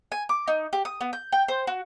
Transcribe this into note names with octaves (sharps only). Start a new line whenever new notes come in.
G#5
D6
D#4
G4
D#6
B3
G6
G5
C5
F#4